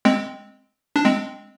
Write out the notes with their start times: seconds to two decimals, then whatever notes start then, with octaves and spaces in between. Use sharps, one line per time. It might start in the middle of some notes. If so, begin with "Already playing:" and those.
0.05 G#3 C4
0.96 D4
1.04 G#3 C4